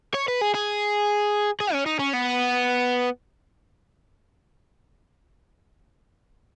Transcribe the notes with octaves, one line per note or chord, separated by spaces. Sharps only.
C#5
B4
G#4
G#4
G#4
C#4
D#4
C#4
B3